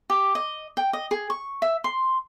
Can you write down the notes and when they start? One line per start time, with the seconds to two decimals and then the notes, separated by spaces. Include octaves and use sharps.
0.10 G4
0.35 D#5
0.77 G5
0.93 D#5
1.11 G#4
1.30 C#6
1.62 E5
1.84 C6